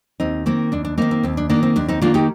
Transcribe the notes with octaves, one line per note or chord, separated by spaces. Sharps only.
D#2 C4 D#4
D#3 A#3 C4
D#2 D4
D4
D#3 A#3 C4 D#4
C4
D#2 C4
D4
D#3 A#3 D4
C4
D#2 D4
C4 D#4
D#3 A#3 D4 F4
D#4 G4